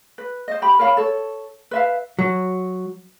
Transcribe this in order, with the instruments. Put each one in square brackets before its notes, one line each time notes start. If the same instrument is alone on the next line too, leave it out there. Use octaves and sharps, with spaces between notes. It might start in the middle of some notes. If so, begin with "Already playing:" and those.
[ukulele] B4
C5 D#5
G4 G5 B5
A#4 C#5 F5 B5
A4 C#5
B4 E5 F5
[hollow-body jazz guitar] F#3